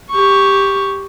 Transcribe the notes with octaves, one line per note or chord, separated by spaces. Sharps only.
G4 C#6